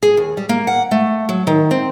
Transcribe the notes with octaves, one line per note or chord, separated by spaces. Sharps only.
G#4
D#2
G3
A#3
F#5
A3
F#3
D#3
C4